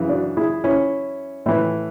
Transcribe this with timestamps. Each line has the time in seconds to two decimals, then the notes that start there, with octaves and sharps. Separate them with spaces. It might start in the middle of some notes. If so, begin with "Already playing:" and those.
Already playing: F#2 C#3 E3
0.09 D4 F#4
0.37 E4 G#4
0.64 C#4 E4
1.46 A2 E3